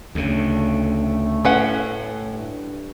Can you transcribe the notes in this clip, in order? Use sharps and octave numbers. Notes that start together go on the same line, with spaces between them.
D2 C#3 A3
A2 C#4 B4 F#5
G2